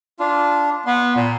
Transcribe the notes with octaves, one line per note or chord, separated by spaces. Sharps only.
D4 F4
B3 C6
A#2